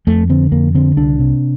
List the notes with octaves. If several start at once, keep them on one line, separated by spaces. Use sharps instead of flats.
F2 A3
D3 C4
F2 A#3
D3 C4
C2 D4
C3